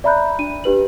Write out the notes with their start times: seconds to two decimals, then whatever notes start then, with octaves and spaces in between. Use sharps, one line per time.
0.04 D5 E5 A#5 B5 F#6 G6
0.39 D4 D#7
0.64 D4 G4 B4 F#7